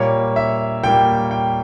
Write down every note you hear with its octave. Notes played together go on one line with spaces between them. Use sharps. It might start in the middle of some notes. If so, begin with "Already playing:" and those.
Already playing: A#2 G3 A#3 C#5
E5
A#2 G3 A#3 G5
G5